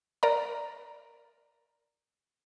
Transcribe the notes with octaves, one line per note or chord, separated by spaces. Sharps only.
A#4 D5 A#5